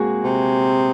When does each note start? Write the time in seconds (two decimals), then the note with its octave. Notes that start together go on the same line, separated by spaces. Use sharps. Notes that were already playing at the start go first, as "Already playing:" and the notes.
Already playing: G#3 A#3 C4 F#4 G#4
0.24 C3